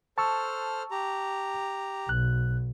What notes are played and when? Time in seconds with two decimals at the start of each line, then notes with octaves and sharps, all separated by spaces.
0.18 A4 C5 A5 C#6 E6 F6
0.91 G4 A#5
2.09 B1 F#6